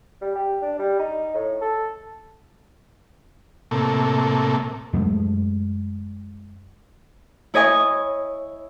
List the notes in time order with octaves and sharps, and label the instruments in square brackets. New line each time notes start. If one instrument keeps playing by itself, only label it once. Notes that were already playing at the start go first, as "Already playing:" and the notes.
[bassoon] G3
G4
D4
G3
D#4
A2
A4
[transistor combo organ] A2 C3 A#3 A4
[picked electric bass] F#2 F#3 G#3 A3
[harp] E4 C#5 D#5 G#5 C#6